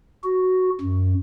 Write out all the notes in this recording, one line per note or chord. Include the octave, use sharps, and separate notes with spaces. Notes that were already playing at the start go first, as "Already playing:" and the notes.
F#4
F#2